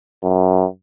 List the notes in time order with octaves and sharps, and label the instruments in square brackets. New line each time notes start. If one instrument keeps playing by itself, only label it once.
[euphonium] F#2